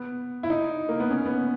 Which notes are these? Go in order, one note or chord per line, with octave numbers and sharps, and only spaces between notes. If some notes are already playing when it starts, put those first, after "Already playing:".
Already playing: B3
E4
D#4
A#3
B3
C#4
B3